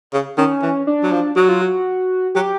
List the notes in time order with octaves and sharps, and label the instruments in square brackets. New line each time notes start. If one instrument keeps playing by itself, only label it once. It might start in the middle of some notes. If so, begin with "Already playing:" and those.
[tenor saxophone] C#3
[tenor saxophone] D#3 [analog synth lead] C#4
[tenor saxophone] E3
[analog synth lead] D4
[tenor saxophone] F#3
F3
[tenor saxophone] F#3 [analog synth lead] F#4
[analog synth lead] F4
F#4
[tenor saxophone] F#3 [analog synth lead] G4